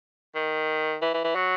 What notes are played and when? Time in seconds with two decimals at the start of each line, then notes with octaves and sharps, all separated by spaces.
0.35 D#3
1.02 E3
1.14 E3
1.24 E3
1.35 F#3